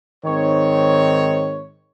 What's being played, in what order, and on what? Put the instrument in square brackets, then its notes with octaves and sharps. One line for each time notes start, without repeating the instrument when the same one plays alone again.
[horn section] G#2 D#3 C4 C#5